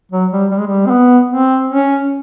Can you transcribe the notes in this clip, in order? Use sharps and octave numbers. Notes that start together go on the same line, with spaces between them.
F#3
G3
G3
G#3
G3
C4
B3
C4
C#4